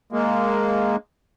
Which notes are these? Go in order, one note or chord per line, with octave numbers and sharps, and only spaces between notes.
G#3 A#3